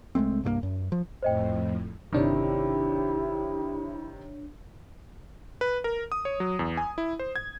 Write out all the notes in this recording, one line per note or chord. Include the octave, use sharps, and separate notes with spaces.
C2 G#3 A3 C4
C2 G2 F3 A#3
F#2
F3
F2 A2 C5 D#5 G5
G1 C3 D#3 D4 E4 G4 C#5
B4
A#4
D#6
C#5
F#3
E2
G#5
E4
C5
G#6